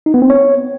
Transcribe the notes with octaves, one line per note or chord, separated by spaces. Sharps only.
D#4
B3
C4
C#5